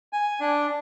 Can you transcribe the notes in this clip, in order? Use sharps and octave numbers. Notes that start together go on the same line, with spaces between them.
G#5
D4